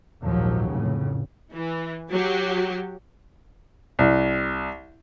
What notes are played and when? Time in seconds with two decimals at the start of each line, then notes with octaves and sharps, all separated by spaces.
0.24 A#1 D#2 G#2 F3 F#3
0.68 F1 A2 C#3
1.53 E3
2.12 F#3 F#4 G4
3.99 C2